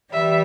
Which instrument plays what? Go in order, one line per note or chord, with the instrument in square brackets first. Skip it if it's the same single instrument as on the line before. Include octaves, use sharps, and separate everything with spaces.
[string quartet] E3 G3 [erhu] E5